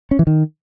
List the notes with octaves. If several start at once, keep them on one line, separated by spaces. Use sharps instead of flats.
C#4
E3
D#3